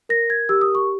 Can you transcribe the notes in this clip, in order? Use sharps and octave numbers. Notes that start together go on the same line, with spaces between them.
A#4 A#6
G#6
G4 E6
D#6
C#6